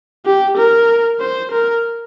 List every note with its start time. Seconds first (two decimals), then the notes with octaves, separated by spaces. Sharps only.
0.26 G4
0.57 A#4
1.20 C5
1.52 A#4